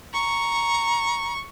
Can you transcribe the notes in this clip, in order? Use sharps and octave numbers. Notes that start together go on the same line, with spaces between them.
A#5 C#6